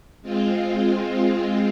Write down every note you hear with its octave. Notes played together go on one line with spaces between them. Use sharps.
G#3 C4 F4